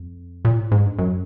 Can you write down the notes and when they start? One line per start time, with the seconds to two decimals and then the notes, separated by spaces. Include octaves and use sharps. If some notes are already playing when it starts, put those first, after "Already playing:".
Already playing: F2
0.45 A#2
0.58 A2
0.72 G#2
0.85 G2
0.99 F#2